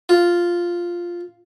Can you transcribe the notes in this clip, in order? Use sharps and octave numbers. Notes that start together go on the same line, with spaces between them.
F4